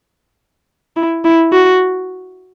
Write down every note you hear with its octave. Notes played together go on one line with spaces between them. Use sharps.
E4
E4
F#4